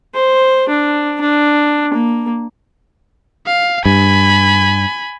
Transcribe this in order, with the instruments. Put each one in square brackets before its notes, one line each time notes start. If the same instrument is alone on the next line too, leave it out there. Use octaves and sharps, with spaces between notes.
[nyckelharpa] C5
D4
D4
A#3
[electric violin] F5
[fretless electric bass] G2 [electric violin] G#5 B5